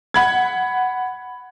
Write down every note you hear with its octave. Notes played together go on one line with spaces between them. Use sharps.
F#5 B5 G#6